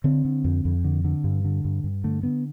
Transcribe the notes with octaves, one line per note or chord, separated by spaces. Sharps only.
D3 C4
D3
F2
F2
D3
D3
G2
D3
G2
G2
D3 A3
D3 B3